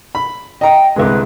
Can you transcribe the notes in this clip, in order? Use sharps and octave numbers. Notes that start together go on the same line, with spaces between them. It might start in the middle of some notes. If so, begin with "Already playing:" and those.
B5
D#5 G5 A#5
C2 D3 G#3 B4